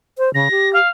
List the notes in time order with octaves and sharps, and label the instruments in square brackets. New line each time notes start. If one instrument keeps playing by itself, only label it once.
[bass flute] C5
[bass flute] C#3 [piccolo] A#6
[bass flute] G4
[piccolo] F5